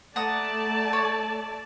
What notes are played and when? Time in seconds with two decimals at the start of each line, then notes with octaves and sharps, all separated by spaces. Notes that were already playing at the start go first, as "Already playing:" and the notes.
0.16 A3 D5 F#5 A5 A#5 D#6
0.93 C#5